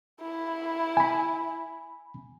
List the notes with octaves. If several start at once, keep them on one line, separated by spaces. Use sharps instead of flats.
E4
G#5 B5